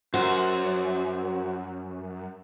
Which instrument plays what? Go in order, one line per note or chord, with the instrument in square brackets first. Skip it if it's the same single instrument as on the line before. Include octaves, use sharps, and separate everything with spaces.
[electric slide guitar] F#2 [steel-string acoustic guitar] F#4 C5